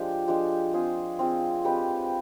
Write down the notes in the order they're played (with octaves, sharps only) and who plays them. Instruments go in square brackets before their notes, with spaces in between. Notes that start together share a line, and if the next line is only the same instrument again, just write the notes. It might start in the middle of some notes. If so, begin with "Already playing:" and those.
Already playing: [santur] F3 G#3 D4 G4
F3 G#3 D4 G4
C4 F4 G#4
C4 F4 G#4
G#3 C4 G4 B4